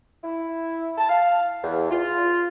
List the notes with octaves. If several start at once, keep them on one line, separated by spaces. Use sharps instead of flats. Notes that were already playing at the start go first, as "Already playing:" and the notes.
E4
A5
F5
E2
F4